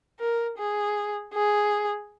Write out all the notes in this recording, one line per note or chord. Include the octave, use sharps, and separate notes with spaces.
A#4
G#4
G#4